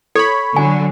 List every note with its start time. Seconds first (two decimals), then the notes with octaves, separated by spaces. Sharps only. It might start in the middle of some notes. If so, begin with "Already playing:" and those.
0.15 A4 C#5 B5
0.56 D3 F#3 G#5